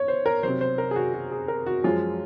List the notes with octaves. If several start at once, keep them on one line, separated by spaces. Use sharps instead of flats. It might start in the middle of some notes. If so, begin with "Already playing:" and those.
Already playing: C#5
C5
A#4
C3 F#3 C5
C5
A#4
G#4
F#4
F#4
G#4
A#4
F#4
F#2 F3 G#3 F4